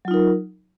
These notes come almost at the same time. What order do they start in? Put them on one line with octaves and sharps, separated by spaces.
F#3 F4 D#4 A#4